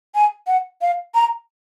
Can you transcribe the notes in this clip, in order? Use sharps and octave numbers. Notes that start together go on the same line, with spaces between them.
G#5
F#5
F5
A#5